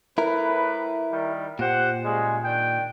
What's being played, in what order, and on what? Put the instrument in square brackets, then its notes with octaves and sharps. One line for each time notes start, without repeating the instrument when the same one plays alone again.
[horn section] A2 B4 [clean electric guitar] E4 A#4
[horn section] D#3 G3
[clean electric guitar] A#2 [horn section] G4 C5 F#5
[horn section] C#3 G3 G#3
D#3 D4 G5